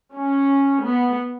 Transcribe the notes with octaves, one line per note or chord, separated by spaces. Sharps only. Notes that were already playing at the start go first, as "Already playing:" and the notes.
C#4
B3